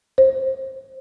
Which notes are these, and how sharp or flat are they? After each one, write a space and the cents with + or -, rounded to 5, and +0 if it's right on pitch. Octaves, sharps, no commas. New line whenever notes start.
C5 +20